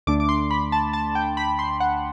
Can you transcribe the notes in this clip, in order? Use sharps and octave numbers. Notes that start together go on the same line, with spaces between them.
D2 D3 A3 D4 D6
D6
C6
B5
A5
A5
G5
B5
C6
F#5